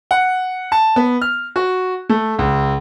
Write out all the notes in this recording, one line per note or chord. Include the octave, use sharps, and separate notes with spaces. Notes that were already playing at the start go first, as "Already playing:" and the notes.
F#5
A5
B3
F6
F#4
A3
C#2